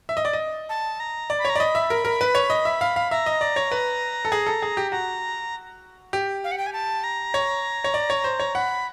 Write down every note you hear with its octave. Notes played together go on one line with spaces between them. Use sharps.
E5
D#5
D5
D#5
A5
A#5
D5
B5
C#5 A#5
D5
D#5 B5
E5
A#4
A#4
B4
C#5
D#5
E5
F5
F5
E5 A#5
D#5
D5
C#5
B4
A4
G#4
A4
G#4
G4
F#4 A#5
G4
F5
F#5
G5
G#5
A5
A#5
C#5
C#5
D5
C#5
C5
C#5
F#5 B5